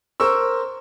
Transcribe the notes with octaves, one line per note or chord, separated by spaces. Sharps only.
A#4 C5 C#6 E6